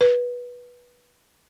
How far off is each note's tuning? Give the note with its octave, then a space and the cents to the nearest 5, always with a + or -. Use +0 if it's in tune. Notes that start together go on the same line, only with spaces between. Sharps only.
B4 -15